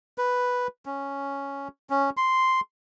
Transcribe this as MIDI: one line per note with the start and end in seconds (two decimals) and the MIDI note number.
0.18 0.67 71
0.86 1.68 61
1.90 2.10 61
2.17 2.60 84